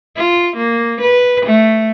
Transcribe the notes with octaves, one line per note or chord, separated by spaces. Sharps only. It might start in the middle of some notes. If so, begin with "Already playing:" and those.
F4
A#3
B4
A3